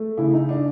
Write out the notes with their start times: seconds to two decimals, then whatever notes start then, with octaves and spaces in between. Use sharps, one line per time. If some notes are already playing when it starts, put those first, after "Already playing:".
Already playing: A3
0.18 C#3 E4
0.33 D#4
0.49 D4